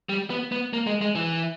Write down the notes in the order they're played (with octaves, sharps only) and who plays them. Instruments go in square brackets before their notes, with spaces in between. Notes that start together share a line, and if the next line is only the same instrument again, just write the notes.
[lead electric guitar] G3
B3
B3
A#3
G#3
G#3
E3